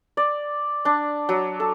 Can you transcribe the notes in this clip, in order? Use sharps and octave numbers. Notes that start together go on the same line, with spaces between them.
D5
D4
F#3
A4